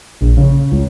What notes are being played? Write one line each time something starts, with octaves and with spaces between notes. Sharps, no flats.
A#1
C#3
C#2